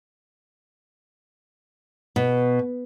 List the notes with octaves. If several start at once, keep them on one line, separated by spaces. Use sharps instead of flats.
B2